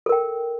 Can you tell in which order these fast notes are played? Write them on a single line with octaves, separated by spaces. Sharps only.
A4 A#4 G5